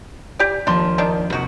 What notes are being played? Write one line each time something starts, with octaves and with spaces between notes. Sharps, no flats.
G4 D5
D#2 F3 D4 A5 C6
D#3 D4
C3 D#3 F#4